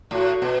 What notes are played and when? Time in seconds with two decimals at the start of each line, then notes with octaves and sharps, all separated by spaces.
0.11 A2 F#4
0.42 B2